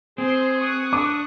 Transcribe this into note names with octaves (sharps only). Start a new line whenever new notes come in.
C4 G#4 C5 C6
C#6 D#6 F#6
D4 D6